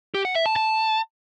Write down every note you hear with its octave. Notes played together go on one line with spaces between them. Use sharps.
G4
F#5
E5
A5
A5